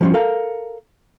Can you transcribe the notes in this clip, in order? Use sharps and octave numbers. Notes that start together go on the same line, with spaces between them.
F3 G3 C#4 D#4 F4
A4 A#4 F5